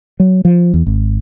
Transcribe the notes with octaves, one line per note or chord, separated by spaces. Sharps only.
F#3
F3
E2
G#1